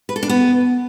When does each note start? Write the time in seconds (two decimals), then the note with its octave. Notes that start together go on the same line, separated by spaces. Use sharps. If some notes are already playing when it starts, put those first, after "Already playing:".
0.09 B4
0.16 A4
0.23 D4
0.29 B3